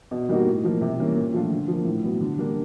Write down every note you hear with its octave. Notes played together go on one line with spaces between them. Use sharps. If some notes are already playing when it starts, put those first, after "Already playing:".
B2
G3 A#3 D#4 F#4
A2
F3 A#3
C3
E3 G3 A#3 C#4
A#2
F3 A3 D4 F4
D3
F3 A#3
A2
F#3 B3
D3
G3 A#3 D4